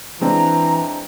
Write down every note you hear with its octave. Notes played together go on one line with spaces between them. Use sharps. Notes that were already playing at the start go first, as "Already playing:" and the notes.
E3 G#3 C4 D4 A#5